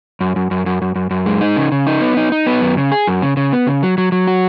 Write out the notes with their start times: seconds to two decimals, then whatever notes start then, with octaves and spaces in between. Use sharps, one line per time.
0.21 F#2
0.36 F#2
0.51 F#2
0.66 F#2
0.82 F#2
0.96 F#2
1.11 F#2
1.26 G#3
1.41 D#4
1.57 C#3
1.72 C#3
1.87 D#4
2.01 B3
2.17 D#4
2.32 D#4
2.47 B3
2.61 F#2
2.77 C#3
2.92 G#4
3.07 F#2
3.22 C#3
3.37 C#3
3.53 B3
3.67 C#3
3.83 F#3
3.98 F#3
4.12 F#3
4.27 F#4